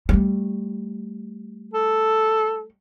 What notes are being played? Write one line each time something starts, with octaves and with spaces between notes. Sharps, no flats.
G3 A3
A4